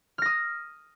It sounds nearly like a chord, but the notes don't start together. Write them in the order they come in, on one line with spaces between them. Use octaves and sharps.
F6 A#6 D#6